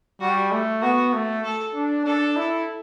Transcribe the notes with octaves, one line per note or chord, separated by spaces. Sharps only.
G3 F#4
A3
B3 F#4
A3
A4
D4
D4 A4
E4